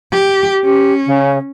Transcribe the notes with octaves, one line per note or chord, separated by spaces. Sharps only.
G4
C#4 G4
C#3